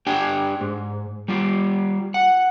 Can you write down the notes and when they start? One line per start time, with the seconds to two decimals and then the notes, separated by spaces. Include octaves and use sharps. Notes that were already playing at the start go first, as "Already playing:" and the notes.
0.07 D4 G4 G5 G#5
0.61 G#2
1.28 G3 F4 G4
2.14 F#5